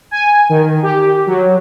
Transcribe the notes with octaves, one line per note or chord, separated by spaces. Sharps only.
G#5
D#3
G4
F#3